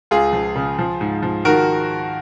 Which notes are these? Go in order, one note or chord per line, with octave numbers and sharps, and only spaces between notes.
C#2 F4 G#4
F3
C#3
F3
G#2
F3
D#3 F#4 A#4